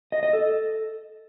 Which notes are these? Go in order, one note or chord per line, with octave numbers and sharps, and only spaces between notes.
D#5
D#5
A4